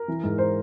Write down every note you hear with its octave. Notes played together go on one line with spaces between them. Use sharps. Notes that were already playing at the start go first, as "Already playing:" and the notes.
Already playing: A#4
E3
G#2
C5